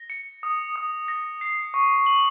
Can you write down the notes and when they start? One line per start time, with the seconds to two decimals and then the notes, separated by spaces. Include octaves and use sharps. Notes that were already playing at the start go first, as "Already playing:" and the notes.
Already playing: A#6
0.10 C#7
0.43 D#6
0.76 D#6
1.08 A#6
1.41 C7
1.74 C#6
2.06 F#7